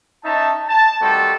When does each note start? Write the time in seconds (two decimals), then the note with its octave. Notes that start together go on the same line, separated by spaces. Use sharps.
0.24 C#4 D#4 E5 A5
0.69 A5
1.00 D#3 G3 A3 C4 F#4 A4